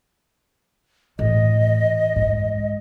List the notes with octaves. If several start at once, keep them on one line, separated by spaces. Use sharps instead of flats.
A2 E3 D#5
G#2